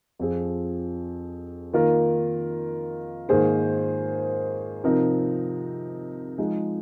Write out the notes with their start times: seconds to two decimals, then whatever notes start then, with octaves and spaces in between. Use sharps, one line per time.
0.19 F2 F3 C4 G#4
1.73 D#3 A#3 F4 A#4
3.29 G#2 D#3 A#3 G#4 C5
4.84 C3 F3 C4 D#4 A#4
6.38 F3 G#3 D#4